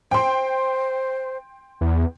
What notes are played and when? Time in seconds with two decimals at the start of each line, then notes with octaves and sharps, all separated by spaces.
0.11 C5 G5 C6
1.81 E2